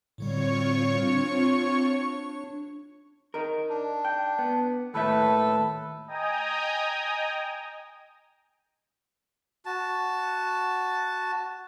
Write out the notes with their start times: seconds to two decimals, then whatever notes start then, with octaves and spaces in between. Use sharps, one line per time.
0.18 A2 D3 G3 C4 F4 C#5 C#6
1.07 D4
3.34 D#4 A#4
3.69 D4
4.05 G5
4.39 B3
4.94 D#2 A2 A4 B4 E5
6.08 D#5 G5 G#5 A#5 D#6
9.66 F#4 A5